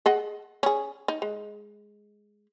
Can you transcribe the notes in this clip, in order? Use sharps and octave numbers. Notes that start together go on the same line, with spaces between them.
G#4 D#5 F#5
C#4 G#4
D#4
G#3